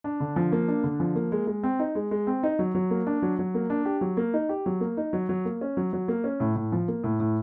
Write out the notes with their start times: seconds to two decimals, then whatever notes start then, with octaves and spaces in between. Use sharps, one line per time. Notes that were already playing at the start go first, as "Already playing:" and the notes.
0.04 D4
0.20 D3
0.36 F3
0.52 A#3
0.68 D4
0.84 D3
1.00 F3
1.15 A#3
1.32 G#3
1.47 G#3
1.63 C4
1.79 D#4
1.95 G#3
2.11 G#3
2.27 C4
2.43 D#4
2.59 F#3
2.75 F#3
2.91 A#3
3.07 D4
3.22 F#3
3.39 F#3
3.54 A#3
3.70 D4
3.85 G4
4.01 F#3
4.17 A#3
4.34 D#4
4.49 G4
4.66 F#3
4.81 A#3
4.97 D#4
5.13 F#3
5.29 F#3
5.45 A#3
5.61 C#4
5.77 F#3
5.93 F#3
6.08 A#3
6.24 C#4
6.40 A2
6.56 A2
6.72 F3
6.88 A#3
7.03 A2
7.20 A2